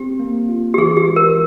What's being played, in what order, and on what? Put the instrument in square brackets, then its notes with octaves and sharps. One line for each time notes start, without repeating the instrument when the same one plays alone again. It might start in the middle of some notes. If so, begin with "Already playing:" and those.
Already playing: [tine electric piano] C4 [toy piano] G4
[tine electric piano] A#3
F4
[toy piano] G4
[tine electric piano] E3 [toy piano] G#4
[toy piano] G4
[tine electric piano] G#3
[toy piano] A#4